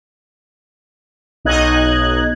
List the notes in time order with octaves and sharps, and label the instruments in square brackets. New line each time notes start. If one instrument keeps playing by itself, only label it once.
[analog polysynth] B1 D#4 D#5 F#6 G#6